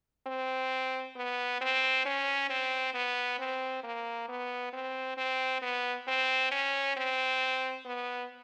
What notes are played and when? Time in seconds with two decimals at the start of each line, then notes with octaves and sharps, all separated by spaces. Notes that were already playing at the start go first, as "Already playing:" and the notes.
0.27 C4
1.16 B3
1.61 C4
2.05 C#4
2.50 C4
2.94 B3
3.39 C4
3.84 A#3
4.29 B3
4.73 C4
5.17 C4
5.62 B3
6.08 C4
6.51 C#4
6.97 C4
7.86 B3